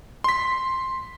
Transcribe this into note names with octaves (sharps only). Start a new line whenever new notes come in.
C6 B6